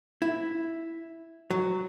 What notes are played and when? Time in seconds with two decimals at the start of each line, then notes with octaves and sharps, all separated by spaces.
0.22 E4
1.50 F#3